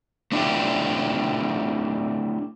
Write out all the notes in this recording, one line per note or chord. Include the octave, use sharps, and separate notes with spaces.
A3 D4 E4 F4 G4